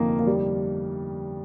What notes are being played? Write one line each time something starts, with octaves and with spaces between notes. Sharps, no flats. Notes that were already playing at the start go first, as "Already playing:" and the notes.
Already playing: G1 F2 C3 F3 A#3 D#4
A#3
G3